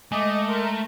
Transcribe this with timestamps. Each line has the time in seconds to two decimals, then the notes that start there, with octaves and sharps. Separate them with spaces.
0.12 G#3 A3 D#5 D6
0.48 A#4 C6